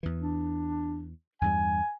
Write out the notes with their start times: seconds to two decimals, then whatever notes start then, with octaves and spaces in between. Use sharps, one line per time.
0.03 E2 E3
0.22 D4
1.41 E2 G2 G3 G#5